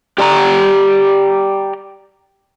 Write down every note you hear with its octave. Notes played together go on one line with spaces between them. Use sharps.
G4 D5 A5 A#5